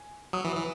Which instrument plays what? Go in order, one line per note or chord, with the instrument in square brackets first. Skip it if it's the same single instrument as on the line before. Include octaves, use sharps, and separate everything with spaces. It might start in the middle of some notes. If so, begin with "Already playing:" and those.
Already playing: [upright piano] G#5
[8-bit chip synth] F#3 [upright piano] D#6
[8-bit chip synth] E3
E3